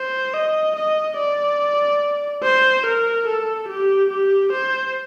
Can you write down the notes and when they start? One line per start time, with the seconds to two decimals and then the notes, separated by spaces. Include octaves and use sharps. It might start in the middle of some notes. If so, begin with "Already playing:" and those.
Already playing: C5
0.34 D#5
0.75 D#5
1.18 D5
2.43 C5
2.85 A#4
3.27 A4
3.69 G4
4.10 G4
4.52 C5